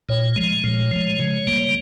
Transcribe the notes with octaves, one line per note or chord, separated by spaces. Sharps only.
A#2 C#5
F3 G#3
A#2
F3 G#3
C#3
G3 A#3